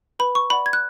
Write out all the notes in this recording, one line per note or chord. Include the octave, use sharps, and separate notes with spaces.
B4 B5
C#6
D5 F#5 B5
G#6
F#6